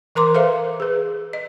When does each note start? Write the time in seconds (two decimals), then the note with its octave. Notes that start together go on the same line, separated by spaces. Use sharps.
0.15 E3 A#4 A#5 C6 D6
0.35 A4 B4 C5 E5 F5
0.80 G#4 B4
1.33 D#5